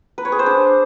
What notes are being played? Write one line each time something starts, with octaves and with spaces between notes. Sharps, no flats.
B4
C#5
G#4
C5
D4